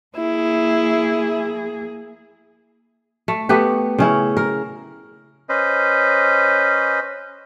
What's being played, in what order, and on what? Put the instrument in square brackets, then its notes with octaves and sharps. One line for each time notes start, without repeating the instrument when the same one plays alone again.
[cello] A#3 G#4 [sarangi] E4
[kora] A3
A3 B3 G4 B4
C#3 C#4 E4
A#4
[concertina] C#4 B4 C5 D#5